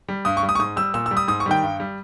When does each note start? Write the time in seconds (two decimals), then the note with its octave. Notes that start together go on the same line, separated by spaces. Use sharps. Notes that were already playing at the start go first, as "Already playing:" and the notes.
0.09 G3
0.25 G2 D#6
0.37 C#6
0.43 G3
0.49 D#6
0.55 C#6
0.59 G#2 D#6
0.76 G3 E6
0.94 A#2 E6
1.06 E6
1.11 G3
1.17 D#6
1.28 G#2 D#6
1.40 C#6
1.46 D#3 G3 G5
1.63 G2
1.80 G3